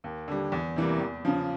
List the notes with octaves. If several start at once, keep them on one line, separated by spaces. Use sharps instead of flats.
D#2
D3 G3
E2
C3 E3 G3 A#3
E2
C#3 F3